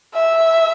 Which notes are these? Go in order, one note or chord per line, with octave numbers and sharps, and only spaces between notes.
E5